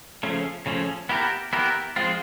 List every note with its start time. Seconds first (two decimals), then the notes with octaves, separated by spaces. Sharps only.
0.23 C#3 F3 A3 C#4
0.66 C#3 F3 A3 C#4
1.09 B3 E4 G4 A#4
1.53 B3 E4 G4 A#4
1.96 F3 G#3 C4 F4